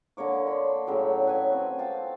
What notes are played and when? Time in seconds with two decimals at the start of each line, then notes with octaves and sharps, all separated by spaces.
0.17 D3 A#3 C#5 D6
0.47 B5 C6
0.87 A2 C#3 F#3 G5
1.27 B4 G#5
1.52 C4
1.79 F5 G5 A5